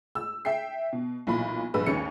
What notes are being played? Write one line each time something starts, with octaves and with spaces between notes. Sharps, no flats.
E6
E5 G5 C7
B2
B1 A#2 E3 B5
A#1 G2 B4 B5 E6
G#1 D#2 C#4 C#7